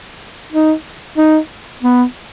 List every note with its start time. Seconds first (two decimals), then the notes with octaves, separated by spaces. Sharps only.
0.53 D#4
1.18 D#4
1.83 B3